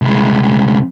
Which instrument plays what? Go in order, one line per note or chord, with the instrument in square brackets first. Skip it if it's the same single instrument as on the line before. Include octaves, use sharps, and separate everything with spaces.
[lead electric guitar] C2 G#3